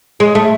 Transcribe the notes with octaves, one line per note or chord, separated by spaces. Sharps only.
G#3
A3